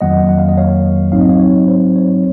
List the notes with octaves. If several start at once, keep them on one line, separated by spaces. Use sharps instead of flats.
F2 D#3 F#3 A#3 D#5 F#5
F#5
F5
D#5
C#5 F5
A#1 G#2 F#3 C4 D#4 F5
D#5
C#5 F5
C#5
C5
C#5